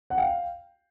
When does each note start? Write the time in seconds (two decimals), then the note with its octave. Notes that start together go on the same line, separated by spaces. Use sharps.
0.10 F#5
0.18 F5 G5